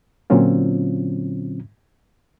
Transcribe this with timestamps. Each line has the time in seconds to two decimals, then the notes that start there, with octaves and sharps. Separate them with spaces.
0.30 A#2 D3 F#3 C4 C#4 F4